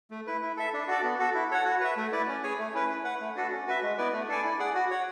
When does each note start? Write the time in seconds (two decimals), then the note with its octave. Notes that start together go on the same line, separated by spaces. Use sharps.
0.11 A3
0.27 E4 B4
0.42 E4
0.57 A4 E5
0.74 D4
0.88 F#4 A4 D5
1.04 B3
1.19 F#4 A4
1.34 E4
1.51 A4 C#5 F#5
1.65 F#4
1.81 B4 E5
1.97 A3
2.12 E4 B4 D5
2.28 C#4
2.43 G#4 C#5 G#5
2.58 A3
2.74 C#4 E4 B4
2.89 E4
3.04 B4 F#5
3.20 A3
3.36 D4 F#4 A4
3.52 C#4
3.67 F#4 B4 E5
3.82 G#3
3.98 B3 E4 B4 D5
4.13 A3
4.28 D4 A4 D5 G#5
4.44 E4
4.59 G#4 D5 F#5
4.75 F#4
4.90 C#5 F#5